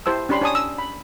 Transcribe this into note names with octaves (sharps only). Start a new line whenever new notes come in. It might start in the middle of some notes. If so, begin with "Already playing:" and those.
E4 G4 C5 A5 E6
C#4 D4 G4 B5 C6
D4 C#5 G#5 A5 D#6
E6
B5